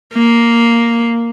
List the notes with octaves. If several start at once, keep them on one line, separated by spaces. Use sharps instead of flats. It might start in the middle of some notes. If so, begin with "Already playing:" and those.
A#3